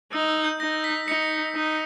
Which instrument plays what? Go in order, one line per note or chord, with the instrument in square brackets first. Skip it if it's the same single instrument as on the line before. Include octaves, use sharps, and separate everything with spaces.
[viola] D#4 [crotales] E6
[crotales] E6
G6
[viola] D#4 [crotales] A#6
[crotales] B6
[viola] D#4 [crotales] C#7
[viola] D#4